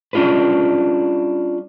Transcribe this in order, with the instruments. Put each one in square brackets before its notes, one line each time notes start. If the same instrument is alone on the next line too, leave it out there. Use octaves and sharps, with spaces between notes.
[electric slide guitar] G3 C#4 D4 F4 G#4 B4